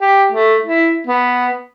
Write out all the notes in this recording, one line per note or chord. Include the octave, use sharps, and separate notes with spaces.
G4
A3
E4
B3